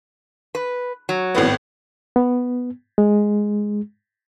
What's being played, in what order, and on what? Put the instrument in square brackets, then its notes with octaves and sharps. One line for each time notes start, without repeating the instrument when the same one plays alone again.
[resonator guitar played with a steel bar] B4
F#3
[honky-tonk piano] G#1 A2 B3
[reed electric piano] B3
G#3